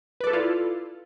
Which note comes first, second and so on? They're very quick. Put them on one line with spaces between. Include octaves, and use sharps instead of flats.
B4 D5 A4 E4 F4